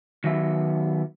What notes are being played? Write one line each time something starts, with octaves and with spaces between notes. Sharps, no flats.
D#3 F#3 B3 E5